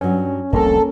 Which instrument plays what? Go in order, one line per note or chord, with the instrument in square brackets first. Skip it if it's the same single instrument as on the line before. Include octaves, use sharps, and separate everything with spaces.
[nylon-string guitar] G2 F#3 [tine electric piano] C#4
[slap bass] F1 C2 [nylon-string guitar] A#3 A#4 [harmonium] A4